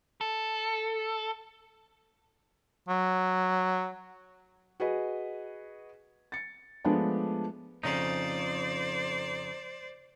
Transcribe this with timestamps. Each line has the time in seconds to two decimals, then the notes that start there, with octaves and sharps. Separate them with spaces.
0.21 A4
2.88 F#3
4.80 F#4 G#4 B4 D#5
6.32 A6 C#7
6.85 F3 G#3 A3 B3 D4 D5
7.83 F2 C#3 D#4 C5 D5